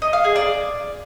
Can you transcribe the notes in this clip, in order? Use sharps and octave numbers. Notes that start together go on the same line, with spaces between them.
D#5
F5
G#4
D5